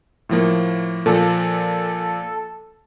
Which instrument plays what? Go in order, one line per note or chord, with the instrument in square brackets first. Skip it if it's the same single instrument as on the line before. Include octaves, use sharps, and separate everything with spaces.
[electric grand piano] A2 F3 A#3
[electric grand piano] A#2 F3 [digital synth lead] A4